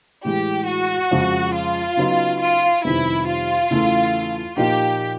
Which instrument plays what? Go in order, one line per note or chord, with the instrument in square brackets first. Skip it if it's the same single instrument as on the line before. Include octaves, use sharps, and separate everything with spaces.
[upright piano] A2 E3 G#3 [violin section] G4
[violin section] F#4
[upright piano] F2 C#3 F3 G#3
[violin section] F4
[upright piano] C#3 F#3 B3 D#4
[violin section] F4
[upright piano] F2 C3 D#3 G3 B3 [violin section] E4
[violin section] F4
[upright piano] E2 C#3 E3 A3
[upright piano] A#2 F3 A#3 D#4 [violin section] G4